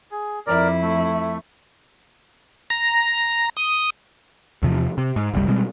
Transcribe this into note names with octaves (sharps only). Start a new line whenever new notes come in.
G#4
F2 E4 A#4 D5
A3
A#5
D#6
E2 C3 F3
C3
G#2
F#1 C2 G3
B2 G3 G#3 C4